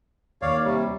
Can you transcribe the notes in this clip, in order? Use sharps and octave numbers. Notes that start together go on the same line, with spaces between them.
D#2 C#5 D5 F5
C3 G3